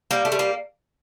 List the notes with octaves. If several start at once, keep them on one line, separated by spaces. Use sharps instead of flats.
G3 A#3
A3
G3
A#3